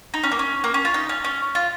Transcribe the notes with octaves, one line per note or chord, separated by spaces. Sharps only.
D#4
C#4
A#3
C#4
A#3
C#4
F4
D#4
C#4
C#4
F4